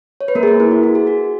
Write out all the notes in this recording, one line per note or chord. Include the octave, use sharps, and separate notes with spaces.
C#5
B4
A#3 A#4
G#4
A#3 A#4
E4
F#4
F#4
G#4
F#4